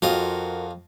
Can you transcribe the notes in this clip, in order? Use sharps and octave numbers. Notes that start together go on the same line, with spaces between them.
F2 F4 F#4 A#4 D#5